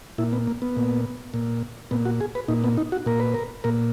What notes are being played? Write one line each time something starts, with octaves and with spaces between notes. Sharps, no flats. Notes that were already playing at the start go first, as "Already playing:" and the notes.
A#2 E4
B3
A#3
B3
A#2
A#2
A#2 B3
F#4
G#4
B4
A#2 D#4
B3
D#4
F#4
A#2 A#4
B4
A#4
A#2 A#4